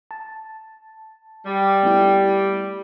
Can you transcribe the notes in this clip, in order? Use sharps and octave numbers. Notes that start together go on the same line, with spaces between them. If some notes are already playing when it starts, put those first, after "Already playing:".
A5
G3
A3 B3 E4